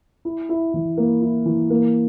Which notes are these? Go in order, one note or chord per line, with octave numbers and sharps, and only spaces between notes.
E4
E4
E3
A#3
E4
E3
A#3